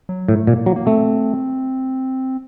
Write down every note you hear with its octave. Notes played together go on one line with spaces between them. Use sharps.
F#3
A2
A3
A#2 A#3
F#3
A#3
A3 C4